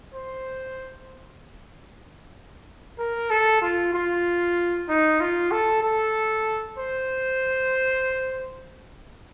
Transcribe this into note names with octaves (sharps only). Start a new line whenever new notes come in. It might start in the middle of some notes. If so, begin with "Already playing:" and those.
C5
A#4
A4
F4
F4
D#4
F4
A4
A4
C5